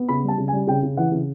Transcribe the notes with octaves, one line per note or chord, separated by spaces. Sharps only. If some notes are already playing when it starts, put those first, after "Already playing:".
Already playing: B3
C#3 B5
G3 A5
C#3
G#5
G3
C#3 G5
C#3
E3 F#5
C#3